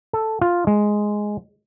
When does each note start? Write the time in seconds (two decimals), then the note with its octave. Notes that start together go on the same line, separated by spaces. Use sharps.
0.13 A4
0.41 F4
0.67 G#3